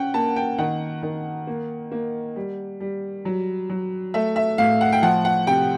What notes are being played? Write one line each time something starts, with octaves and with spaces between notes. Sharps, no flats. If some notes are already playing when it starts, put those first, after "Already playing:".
Already playing: C#4 F#5 G5
A#3 A5
G5
D#3 F#5
D#3
A#3
A#3
G3
G3
F#3
F#3
A3 E5
E5
A2 F5
F#5
G5
F3 F#5
F#5
C3 G5